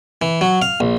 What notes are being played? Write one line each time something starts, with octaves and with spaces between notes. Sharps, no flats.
E3
F#3
F5
A#1